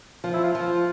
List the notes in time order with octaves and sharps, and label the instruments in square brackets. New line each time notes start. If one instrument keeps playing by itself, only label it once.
[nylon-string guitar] F3 [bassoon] F4
[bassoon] E4
F4
[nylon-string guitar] F3